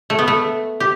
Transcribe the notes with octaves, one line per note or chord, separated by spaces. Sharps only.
A3
B3
A3
G4